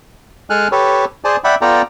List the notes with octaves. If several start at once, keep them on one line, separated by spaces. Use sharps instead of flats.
G#3 A4 G#5 F6 F#6
G4 A4 B4 C#5
G#4 C5 D5 G#5 A5
D5 E5 F#5 G5 B5
B3 F4 A4 D5 G5 A#5